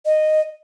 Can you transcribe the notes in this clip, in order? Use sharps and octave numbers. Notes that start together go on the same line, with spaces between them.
D#5